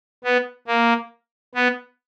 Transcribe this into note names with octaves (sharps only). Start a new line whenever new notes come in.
B3
A#3
B3